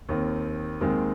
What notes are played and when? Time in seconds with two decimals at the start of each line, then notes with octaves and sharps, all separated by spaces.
0.09 D#2 D#3 C4
0.81 D#2 D#3 G#3 C4